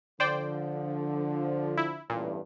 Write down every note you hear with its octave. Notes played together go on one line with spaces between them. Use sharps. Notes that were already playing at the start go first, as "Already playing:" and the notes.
D3 F3 C5 D5 G5
E4
A1 E2 G2 A#2